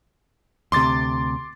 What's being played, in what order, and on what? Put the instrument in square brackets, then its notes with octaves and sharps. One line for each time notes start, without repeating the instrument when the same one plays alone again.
[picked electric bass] D2 C3 [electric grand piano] C6 D6 A6